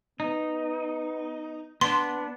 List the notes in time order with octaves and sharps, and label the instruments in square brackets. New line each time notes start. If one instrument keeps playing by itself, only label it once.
[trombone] B3 [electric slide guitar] D#4
[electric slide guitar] B3 D4 [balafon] C6